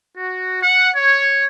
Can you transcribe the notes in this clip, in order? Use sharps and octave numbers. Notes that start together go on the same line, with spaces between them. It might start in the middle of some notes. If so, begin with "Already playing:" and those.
F#4
F#5
C#5